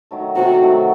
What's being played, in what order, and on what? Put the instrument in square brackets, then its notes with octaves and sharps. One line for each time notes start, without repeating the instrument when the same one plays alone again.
[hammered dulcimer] D#3 F#3 A3
[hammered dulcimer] C3 [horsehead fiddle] F#4
[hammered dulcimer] D#3 F#3 A3